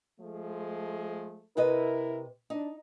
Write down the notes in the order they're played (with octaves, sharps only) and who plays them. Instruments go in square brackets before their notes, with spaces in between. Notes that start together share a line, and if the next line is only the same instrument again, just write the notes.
[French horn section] F3 G#3 A3
[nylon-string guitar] C3 B4 D#5 [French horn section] E4 A#4
[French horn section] D4 [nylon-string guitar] D#4